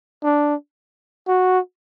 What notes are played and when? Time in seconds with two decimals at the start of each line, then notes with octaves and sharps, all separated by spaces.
0.24 D4
1.28 F#4